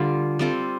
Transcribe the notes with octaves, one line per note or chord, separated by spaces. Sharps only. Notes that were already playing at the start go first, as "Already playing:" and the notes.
Already playing: D3 G3 F4
G3 C4 F4 A4